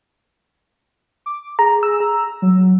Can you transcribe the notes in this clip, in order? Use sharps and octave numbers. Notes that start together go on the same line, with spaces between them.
D6
G#4 A#5
E6
A#5
F#3